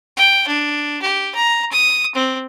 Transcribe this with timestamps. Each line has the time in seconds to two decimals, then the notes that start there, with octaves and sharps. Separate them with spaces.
0.17 G5
0.48 D4
1.02 G4
1.35 A#5
1.72 D#6
2.15 C4